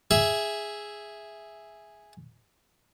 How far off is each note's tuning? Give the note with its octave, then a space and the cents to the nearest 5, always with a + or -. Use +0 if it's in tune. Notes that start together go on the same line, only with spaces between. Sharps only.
G#4 +0 E5 +0